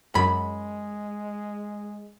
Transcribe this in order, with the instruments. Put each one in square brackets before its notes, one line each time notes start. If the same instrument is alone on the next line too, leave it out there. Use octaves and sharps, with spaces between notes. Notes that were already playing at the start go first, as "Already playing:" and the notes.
[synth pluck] F#2 [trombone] G#3 [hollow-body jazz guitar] B5